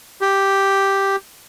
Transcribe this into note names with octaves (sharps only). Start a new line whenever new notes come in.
G4